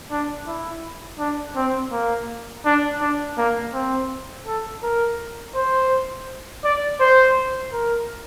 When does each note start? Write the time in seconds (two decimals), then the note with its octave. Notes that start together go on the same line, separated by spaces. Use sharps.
0.11 D4
0.47 E4
1.19 D4
1.56 C4
1.92 A#3
2.65 D4
3.01 D4
3.38 A#3
3.73 C4
4.47 A4
4.83 A#4
5.55 C5
6.64 D5
7.00 C5
7.73 A#4